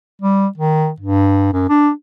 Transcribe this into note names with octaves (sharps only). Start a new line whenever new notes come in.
G3
D#3
G2
F#2
D4